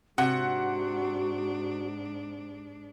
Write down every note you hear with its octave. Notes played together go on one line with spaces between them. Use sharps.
G#2 C3 D4 F#4 F#5